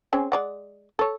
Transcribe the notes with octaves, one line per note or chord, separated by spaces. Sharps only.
C4 C#4 G#4
G#3 D5 F#5
A4 C#5